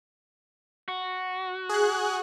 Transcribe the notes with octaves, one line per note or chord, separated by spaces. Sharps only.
F#4
G#4 F#6